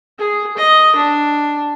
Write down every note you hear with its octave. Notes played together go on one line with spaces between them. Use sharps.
G#4
D#5
D4